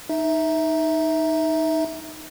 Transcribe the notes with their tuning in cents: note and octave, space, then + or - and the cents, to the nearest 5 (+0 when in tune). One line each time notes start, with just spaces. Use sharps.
D#4 +0 E5 -15